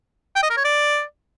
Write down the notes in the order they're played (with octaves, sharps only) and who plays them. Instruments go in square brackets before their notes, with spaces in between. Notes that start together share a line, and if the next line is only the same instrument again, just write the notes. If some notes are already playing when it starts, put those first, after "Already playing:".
[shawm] G5
D#5
A#4
C#5
D5